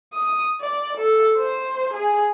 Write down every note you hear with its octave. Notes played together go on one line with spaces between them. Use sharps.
D#6
D5
A4
C5
G#4